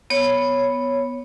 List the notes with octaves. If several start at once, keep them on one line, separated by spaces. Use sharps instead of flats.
B3 C#5